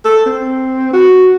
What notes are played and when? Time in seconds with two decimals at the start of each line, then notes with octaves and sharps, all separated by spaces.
0.05 A4
0.26 C4
0.93 F#4